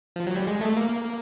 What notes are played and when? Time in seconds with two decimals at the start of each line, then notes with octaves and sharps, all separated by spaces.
0.16 F3
0.27 F#3
0.36 G3
0.47 G#3
0.61 A3
0.77 A#3